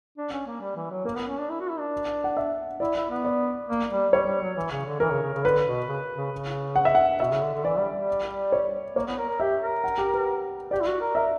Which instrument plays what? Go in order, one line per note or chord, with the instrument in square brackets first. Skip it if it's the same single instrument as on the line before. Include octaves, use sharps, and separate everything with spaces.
[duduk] D4
C#4
A#3
G3
E3
F#3
[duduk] A#3 [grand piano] A#4
[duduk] B3
C#4
D4
E4
F#4
E4
D4
[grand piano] F#5
E5
[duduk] E4 [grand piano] D5
[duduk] E4
B3
[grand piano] D5
[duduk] A#3
G3
[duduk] G3 [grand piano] C#5
[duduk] G3
F#3
E3
C#3
D3
[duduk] E3 [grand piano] A#4
[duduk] C#3
C#3
C#3
[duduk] D3 [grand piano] B4
[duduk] B2
C#3
C#3
C#3
[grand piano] F#5
E5
F#5
[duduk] B2 [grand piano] E5
[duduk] C#3
D3
D3
[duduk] E3 [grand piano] D5
[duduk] G3
G3
[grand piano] C#5
[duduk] A#3 [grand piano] C#5
[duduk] B3
A#4
A#4
[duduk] G4 [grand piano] E5
[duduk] A#4
[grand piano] F#5
G4
B4
[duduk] G4 [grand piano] D5
[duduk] E4
F#4
A#4
[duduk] A#4 [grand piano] E5